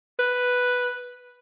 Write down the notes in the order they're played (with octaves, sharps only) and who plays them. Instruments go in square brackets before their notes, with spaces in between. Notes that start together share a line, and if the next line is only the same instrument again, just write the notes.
[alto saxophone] B4